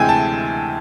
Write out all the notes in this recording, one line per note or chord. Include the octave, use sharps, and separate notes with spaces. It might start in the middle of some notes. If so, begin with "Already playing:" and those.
Already playing: D2 C3 E3 G#3 C4 G5 G#5
A5